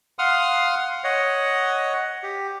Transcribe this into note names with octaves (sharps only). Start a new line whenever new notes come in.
F5 F#5 C6 D#6 F6
C#5 D#5 F#5
G4